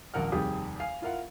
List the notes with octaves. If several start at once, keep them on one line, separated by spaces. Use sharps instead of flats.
D#1 A#1 A#4 F#5 F6
F1 D#2 G3 G4 G#4 D#6
F5 G#5 C7
E4 F4 A#4 F5 F#5